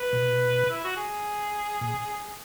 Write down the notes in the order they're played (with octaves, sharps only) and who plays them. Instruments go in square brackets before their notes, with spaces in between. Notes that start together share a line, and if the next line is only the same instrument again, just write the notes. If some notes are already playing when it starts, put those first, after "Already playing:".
Already playing: [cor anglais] B4
[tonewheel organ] B2
[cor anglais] E4
F#4
G#4
[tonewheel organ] A#2